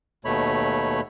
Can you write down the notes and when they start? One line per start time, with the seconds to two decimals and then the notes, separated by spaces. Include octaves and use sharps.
0.25 D#2 B2 A3 C#5 B5